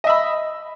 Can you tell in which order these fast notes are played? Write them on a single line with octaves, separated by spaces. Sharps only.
D#5 E5 B5